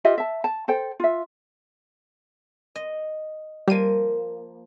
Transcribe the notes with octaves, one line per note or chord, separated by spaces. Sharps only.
F4 G4 D#5 E5
E5 A5
A5
A4 C5 G5
F4 E5
D#5
F3 G3 A#3 D#7